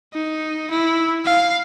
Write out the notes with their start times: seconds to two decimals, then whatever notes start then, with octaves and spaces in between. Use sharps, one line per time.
0.14 D#4
0.70 E4
1.25 F5